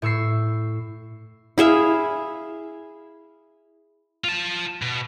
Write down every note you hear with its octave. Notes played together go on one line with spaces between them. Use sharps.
A2 C#6 E6 C7
E4 G#4 E5 F5
F4 A5
B2